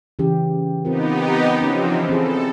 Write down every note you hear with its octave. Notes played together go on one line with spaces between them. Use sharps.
C#3 E3 G4
B3 C4 D#4 F4 G4 A#4
E3 F3 C4 C#4
C4 E4 G#4 A4